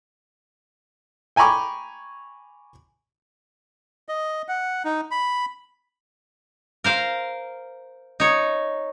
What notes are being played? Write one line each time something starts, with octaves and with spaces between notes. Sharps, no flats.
G5 G#5 A#5 B5 C#6 D6
D#5
F#5
D#4
B5
A#4 C5 F5
D#4 C#5